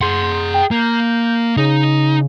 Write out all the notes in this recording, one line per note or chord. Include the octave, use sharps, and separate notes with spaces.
G#4 F#5 C6
G5
A#3 G6
C#3 D#4